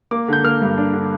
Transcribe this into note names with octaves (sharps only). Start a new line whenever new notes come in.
A#3 D6
D3 G6
A#3 F6
G2
D4
D3